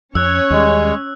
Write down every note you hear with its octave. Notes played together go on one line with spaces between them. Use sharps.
F2 C#4 C#5 E6 F#6
D#2 G3 G#3